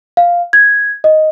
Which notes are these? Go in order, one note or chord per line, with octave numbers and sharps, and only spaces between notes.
F5
G#6
D#5